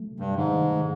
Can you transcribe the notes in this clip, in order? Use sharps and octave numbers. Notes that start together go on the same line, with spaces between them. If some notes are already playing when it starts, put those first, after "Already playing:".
Already playing: F#3 A3
C3
G2
G#2 D#3
A3